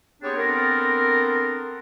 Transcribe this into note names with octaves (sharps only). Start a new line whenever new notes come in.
B3 C4 D4 G4 G#4 C#5
B3 C4 D4 A4 A#4